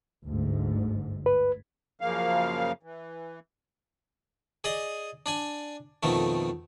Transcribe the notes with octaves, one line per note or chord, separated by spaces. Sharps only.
G1 D2 G#2
B4
F#2 C#3 F3 A#3 F5
E3
G#4 D5 D#5 D#6
D4 D5 G#5
F2 B2 D#3 A3